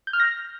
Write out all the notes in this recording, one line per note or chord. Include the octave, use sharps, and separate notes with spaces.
G6
F6
A#6